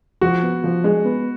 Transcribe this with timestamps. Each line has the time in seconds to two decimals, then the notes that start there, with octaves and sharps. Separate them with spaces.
0.21 F3 F#4
0.42 B3
0.64 F3
0.84 G#3
1.05 B3